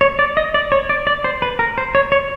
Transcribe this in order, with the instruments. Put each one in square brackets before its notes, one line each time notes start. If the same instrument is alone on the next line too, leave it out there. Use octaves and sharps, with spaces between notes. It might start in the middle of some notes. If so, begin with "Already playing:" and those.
[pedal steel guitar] C#5
D5
D#5
D5
C#5
D5
D5
C5
B4
A#4
C5
C#5
C#5